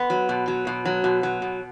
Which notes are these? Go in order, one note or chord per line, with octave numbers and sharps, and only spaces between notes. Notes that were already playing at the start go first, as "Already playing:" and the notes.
Already playing: B3
F#3
B2
F#3
B2
F#3
B2
F#3
B2